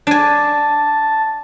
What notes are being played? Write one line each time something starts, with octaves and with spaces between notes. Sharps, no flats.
D4 G#5 A5